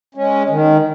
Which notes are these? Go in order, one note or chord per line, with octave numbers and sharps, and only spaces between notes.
G#3 C#4
D#3